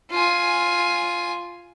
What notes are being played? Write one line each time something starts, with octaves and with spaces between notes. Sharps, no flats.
F4 G#5